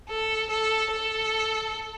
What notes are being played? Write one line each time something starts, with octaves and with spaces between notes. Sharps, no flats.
A4
A4
A4